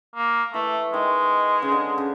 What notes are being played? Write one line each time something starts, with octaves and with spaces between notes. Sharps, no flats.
A#3
E3 A3
D#3 G#3
C#3
D3
C#3